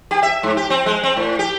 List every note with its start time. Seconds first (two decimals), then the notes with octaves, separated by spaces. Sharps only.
0.11 G4
0.23 E5
0.43 G#2
0.57 G4
0.70 C4
0.86 G#3
1.03 C4
1.17 A2
1.39 G4